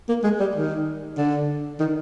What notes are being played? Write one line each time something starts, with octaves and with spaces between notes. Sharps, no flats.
A#3
G#3
G3
D#3
D3
D#3